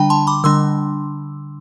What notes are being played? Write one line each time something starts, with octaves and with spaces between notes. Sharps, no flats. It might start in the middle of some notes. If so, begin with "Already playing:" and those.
Already playing: D3 G3 D4 G5 A5 B5
A5 C6
B5 D6
D3 G3 D4 C6 E6